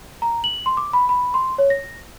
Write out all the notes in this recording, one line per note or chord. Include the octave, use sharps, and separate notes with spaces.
A#5
F#7
C6
D6
B5
B5
C6
C#5
A#6